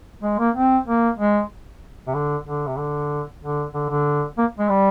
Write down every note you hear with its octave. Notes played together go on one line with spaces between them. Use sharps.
G#3
A#3
C4
A#3
G#3
C3
D3
D3
C3
D3
D3
D3
D3
A#3
G#3
G3